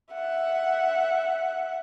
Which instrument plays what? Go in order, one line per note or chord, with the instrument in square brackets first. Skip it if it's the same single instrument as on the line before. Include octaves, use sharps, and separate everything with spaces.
[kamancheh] E5 F#5